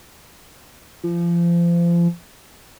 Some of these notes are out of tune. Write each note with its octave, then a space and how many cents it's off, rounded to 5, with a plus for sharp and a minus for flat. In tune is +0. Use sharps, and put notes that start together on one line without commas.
F3 -30